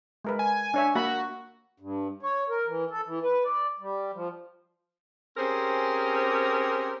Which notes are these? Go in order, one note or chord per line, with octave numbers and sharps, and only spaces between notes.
G#3 A#4 B4
G#5
D4 C#5 E5
A#3 F#4 E5 B5
G2
C#5
A#4
E3
A4
E3
B4
D5
G3
F3
C4 C#4 G4 G#4 A#4 C5